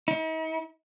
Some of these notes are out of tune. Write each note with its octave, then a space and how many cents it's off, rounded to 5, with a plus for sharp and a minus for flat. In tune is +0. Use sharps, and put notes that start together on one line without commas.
D#4 +45